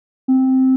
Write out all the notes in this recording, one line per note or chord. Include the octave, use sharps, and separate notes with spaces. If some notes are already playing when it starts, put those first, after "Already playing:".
C4